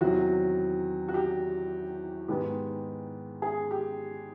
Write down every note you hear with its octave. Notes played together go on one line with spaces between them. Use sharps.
E2 C3 D#3 F#3 F#4
F#4
G4
G#2 D#3 G#3 B3 G4
G#4
G4